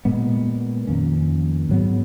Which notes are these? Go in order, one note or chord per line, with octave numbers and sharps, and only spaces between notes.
A#2 G#3 B3
F2 D#3 A#3 C#4
G#2 F#3 B3